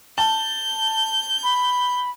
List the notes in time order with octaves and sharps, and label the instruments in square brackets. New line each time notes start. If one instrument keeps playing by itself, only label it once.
[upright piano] A5 [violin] G6
[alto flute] B5